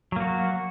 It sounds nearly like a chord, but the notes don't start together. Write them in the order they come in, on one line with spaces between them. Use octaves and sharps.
F#3 A#3 F#4